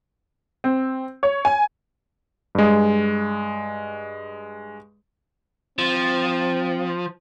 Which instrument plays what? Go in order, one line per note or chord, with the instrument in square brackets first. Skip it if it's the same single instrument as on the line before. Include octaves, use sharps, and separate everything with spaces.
[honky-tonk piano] C4
C#5
G#5
[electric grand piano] G2 G#3
[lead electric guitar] F3 [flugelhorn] C4